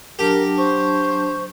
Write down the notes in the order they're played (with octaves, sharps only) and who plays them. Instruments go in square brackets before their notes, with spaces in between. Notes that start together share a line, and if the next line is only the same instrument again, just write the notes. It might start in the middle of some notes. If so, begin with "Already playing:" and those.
[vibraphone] F#3 D4 A5 [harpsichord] G4 [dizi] A#4
[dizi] C5 [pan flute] C#6